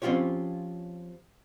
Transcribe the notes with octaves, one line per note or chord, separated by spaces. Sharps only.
F3 C4 C#4 F4 G4 C#5